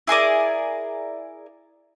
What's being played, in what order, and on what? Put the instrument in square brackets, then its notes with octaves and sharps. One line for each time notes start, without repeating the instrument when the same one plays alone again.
[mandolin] E4 G#4 A#4 D5